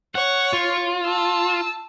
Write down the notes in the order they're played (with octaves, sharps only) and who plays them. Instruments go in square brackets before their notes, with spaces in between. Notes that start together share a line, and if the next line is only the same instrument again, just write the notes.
[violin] C#5 [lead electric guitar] F#5
[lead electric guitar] F4
[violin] A5 E6